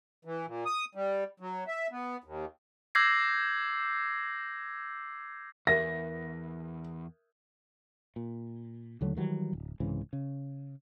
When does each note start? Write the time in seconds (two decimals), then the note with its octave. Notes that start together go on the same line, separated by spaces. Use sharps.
0.25 E3
0.46 A#2
0.66 D#6
0.95 G3
1.40 F#3
1.67 E5
1.91 B3
2.24 D#2
2.95 D6 E6 G6 G#6 A#6 C7
5.67 E2 A#4 E5 A#6
8.16 A#2
9.01 D#2 D3 F#3 A3
9.17 D#3 E3 F#3 G3
9.53 D1
9.80 C2 G#2 C#3 E3
10.13 C#3